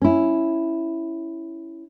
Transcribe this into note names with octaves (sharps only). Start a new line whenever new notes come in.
C#4 E4